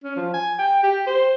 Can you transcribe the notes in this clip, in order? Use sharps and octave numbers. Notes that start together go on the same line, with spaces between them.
C#4
F3
G#5
G5
G4
C5